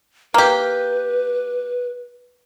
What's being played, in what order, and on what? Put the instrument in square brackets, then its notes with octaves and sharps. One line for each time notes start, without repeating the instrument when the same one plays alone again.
[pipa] A#3 G4 [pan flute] B4